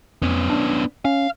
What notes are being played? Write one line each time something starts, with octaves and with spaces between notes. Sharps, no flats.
F2 B3 C#4
D4
C#4 F5